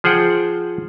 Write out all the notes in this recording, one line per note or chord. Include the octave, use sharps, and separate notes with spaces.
F3 G#4 C5 F#5 G5